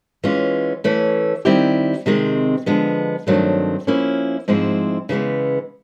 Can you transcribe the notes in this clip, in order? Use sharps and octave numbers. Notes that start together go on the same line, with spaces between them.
E3 G#3 C#4 F4
E3 A3 C#4
D#3 G3 C4 E4 G4
C3 D#3 G#3 C4
D3 F3 G#3 B3
G2 D#3 F#3 A3 C4
F3 A#3 C#4 E4
G#2 F3 G#3 C4 E4
C#3 E3 G#3 B3